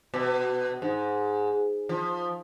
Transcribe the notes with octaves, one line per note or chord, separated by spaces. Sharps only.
B2
G#2
F3